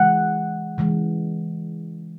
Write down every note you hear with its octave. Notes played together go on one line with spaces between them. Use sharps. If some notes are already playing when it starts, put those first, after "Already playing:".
Already playing: C#3 E3 G#3 F#5
C#3 E3 G#3